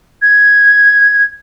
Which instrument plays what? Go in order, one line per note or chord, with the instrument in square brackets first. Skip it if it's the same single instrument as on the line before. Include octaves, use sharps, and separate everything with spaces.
[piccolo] G#6